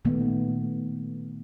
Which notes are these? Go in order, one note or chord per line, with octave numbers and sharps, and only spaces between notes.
A#2 D#3 A3 B3